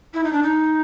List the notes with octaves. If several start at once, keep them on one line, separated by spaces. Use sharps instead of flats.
E4
D#4
D4
D#4